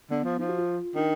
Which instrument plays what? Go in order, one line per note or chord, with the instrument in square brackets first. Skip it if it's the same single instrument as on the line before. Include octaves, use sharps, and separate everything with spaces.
[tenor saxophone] D3 [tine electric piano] B3
[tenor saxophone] F3
[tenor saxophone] F3 [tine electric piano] D#4
[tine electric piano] F#4
F4
[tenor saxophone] D#3 [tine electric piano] D4